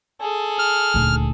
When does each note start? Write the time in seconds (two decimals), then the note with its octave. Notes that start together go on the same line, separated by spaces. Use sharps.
0.21 G#4 A4
0.59 F6
0.94 D#1 D2